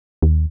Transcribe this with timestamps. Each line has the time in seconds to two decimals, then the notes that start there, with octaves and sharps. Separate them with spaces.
0.22 D#2